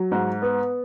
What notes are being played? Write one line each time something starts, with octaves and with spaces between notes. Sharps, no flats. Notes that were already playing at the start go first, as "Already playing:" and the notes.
Already playing: F#3
G#2
B3